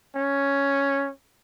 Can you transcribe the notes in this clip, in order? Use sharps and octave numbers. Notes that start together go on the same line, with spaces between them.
C#4